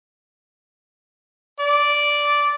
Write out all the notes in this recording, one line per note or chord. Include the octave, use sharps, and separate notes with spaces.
D5